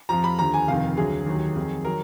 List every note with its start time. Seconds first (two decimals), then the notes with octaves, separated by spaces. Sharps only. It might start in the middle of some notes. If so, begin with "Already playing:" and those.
0.09 F2 F3 A#5
0.24 B5
0.38 D#2 D3 F3 A#5
0.54 G#5
0.68 F1 F2 D#3 F5
0.97 D2 D3 F#3 G#4
1.26 D#2 D#3 F#3
1.56 F2 D#3 F#3
1.85 D#3 F#3 A#4